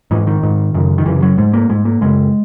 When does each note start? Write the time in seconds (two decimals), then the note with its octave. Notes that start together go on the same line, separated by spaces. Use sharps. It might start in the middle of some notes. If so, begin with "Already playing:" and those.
0.11 G#2 E3
0.27 D#3
0.43 G#2
0.74 F#2 C#3
0.98 D#3
1.06 F#2 C#3 E3
1.22 F#3
1.38 G#2 G#3
1.53 A#3
1.70 G#2 G#3
1.85 A#3
2.01 F#2 C#3 G#3